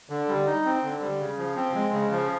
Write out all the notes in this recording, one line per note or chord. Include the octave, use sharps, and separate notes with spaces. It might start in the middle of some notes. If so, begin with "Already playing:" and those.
D3
G3
D#4
C4
D3
G3
C#3
F3
C4
G#3
C#3
F3